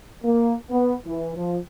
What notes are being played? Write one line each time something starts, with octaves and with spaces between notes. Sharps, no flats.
A#3
B3
E3
F3